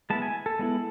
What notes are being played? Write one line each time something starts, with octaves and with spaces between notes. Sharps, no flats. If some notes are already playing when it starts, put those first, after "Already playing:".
G#3 B3 E4 A5
G#5
A4
G#3 B3 E4